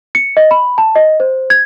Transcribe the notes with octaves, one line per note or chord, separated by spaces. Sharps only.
C#7
D#5
B5
A5
D#5
C5
G#6